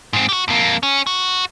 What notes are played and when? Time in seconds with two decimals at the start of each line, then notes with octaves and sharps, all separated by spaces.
0.13 G#2 C4
0.29 F#4 G4
0.48 F2 A#3
0.83 C#4
1.07 F#4